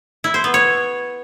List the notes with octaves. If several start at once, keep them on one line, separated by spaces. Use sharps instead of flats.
E4
C5
B3
C#5